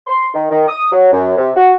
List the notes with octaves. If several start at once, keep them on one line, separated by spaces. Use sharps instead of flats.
C6
D#3
D#3
D#6
F#3
F#2
C3
F#4